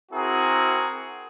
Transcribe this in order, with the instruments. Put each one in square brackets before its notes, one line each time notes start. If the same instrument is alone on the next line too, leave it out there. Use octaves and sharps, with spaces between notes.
[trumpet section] C4 E4 F#4 G#4 A#4